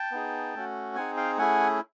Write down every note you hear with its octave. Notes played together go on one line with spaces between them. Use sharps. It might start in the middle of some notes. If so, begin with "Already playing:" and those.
Already playing: G5 A5
B3 D#4 G#4
A3 C#4 F#4
C4 D#4 G#4 F#5 G#5
F5 G5
A3 C#4 E4 G#4 F#5 G#5